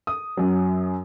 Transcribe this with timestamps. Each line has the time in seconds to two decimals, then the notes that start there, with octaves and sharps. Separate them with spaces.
0.07 D#6
0.37 F#2 F#3